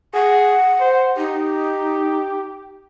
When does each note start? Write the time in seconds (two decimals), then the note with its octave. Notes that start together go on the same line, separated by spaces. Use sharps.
0.14 G#4 F#5
0.80 C5
1.17 D#4 G4